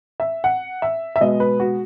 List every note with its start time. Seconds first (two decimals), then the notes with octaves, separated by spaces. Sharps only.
0.20 E5
0.44 F#5
0.82 E5
1.16 E5
1.21 B2 G#3 B3 D#5
1.40 B4
1.60 F#4